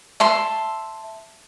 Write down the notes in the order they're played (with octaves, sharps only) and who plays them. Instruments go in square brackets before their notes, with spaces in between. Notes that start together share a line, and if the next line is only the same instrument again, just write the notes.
[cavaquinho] E5 A5 C6